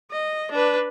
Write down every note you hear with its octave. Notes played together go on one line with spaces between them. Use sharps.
D#5
D4 B4